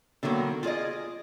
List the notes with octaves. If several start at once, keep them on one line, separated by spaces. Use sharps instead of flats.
D3 D#3 F#3 A#3 B3
F4 G#4 D5 D#5